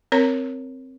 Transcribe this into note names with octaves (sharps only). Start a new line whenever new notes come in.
C4 A#4 C#5 A#5